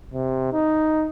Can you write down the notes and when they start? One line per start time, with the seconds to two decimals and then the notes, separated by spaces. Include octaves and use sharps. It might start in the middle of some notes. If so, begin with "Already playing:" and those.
0.14 C3
0.53 D#4